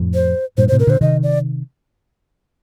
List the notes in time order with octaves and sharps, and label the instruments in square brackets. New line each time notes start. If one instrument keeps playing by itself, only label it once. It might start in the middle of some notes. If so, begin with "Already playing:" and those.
Already playing: [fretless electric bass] F2 A2
[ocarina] C5
[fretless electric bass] G2 A#2 [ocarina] C5
[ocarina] C5
[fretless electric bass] A2 C3
[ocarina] A#4
[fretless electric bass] A#2 D3 [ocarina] C5
[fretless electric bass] C3 D#3 [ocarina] D#5
[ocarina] D5